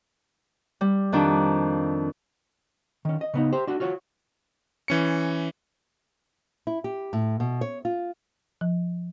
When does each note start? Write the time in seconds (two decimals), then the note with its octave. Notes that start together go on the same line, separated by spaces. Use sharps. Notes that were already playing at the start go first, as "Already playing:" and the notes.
0.81 G3
1.13 F2 D#3 D4
3.05 D#3 C#4
3.21 D#5
3.34 C#3 B3 D#4
3.52 G4 C5
3.67 D4 F#4
3.80 F4 F#4 C#5
4.88 E3 C#4 C#7
6.67 E4
6.84 G4
7.13 A2
7.40 B2
7.61 C#5
7.85 F4
8.61 F3